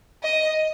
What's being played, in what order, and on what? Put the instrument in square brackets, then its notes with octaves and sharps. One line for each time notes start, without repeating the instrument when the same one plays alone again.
[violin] D#5